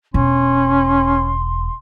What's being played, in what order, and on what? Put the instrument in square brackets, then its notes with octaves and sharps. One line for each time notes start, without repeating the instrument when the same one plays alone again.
[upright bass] E1 [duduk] C#4 [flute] C6